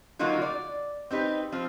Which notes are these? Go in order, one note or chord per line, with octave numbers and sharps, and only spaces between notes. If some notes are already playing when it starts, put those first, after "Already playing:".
D3 F#3 A#3 D#4 F4 F#4
D5
C4 D#4 G4 B4
F3 C4 F4